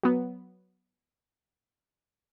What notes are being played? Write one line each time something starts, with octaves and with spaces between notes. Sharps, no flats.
F#3 B3